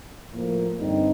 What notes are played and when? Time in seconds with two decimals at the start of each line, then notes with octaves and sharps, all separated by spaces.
0.31 A2 F3 A#3
0.77 G2 D3 G3 C4 D#4